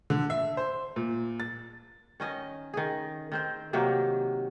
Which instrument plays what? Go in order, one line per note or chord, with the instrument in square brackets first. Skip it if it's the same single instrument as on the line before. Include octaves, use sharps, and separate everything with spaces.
[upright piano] D3
E5
C5
A#2
A6
[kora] D#3 C#4 D#5
D#3 G#4
D#3 C4 C5
C3 D#3 F#3 A#3